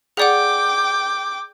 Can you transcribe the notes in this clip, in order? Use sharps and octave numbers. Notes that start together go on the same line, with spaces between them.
G#4 D5 F#5 G5 D6